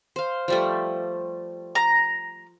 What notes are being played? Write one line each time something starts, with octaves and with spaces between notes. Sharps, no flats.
C5 F5
F3 G3 A3
A#5